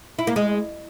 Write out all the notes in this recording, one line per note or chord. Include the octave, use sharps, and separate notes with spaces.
E4
A#3
G#3